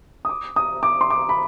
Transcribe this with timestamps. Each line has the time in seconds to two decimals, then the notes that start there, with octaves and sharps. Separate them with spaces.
0.25 D#6
0.29 D6
0.56 D#6
0.83 D6
1.01 C6
1.10 D6
1.29 B5